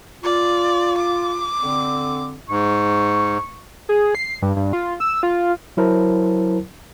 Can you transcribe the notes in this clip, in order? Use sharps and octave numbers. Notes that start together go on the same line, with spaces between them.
F4 D5
D6
D3 C4
G#2 C#6
G#4
C7
G2
G2
F4
E6
F4
F#3 E4 A#4 C5 A5